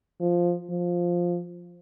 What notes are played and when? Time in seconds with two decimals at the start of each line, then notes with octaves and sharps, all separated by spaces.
0.20 F3
0.70 F3